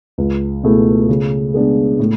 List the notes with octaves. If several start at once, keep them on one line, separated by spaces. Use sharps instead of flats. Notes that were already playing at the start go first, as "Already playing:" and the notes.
C#2
B2 A3 E4 G#4
C#3
G#3 B3 D4
A2